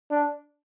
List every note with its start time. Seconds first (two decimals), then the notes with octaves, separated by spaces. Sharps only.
0.10 D4